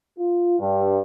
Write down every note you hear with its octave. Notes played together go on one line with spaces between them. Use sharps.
F4
G2